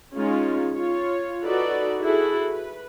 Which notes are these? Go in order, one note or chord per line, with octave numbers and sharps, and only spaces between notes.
G#3 C#4 D#4 F4
F4 C#5
D#4 F#4 A4 B4 D5
E4 F#4 G#4 A4
B4